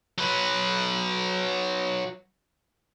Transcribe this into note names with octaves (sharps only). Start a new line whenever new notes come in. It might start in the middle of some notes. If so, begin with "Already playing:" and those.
F#3 B4